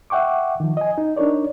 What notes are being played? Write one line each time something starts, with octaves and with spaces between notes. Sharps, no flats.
E5 F#5 G5 C#6 D6
D#3 F3
D#5 G#5
D#4
D4 D#4 A#4 C#5 D5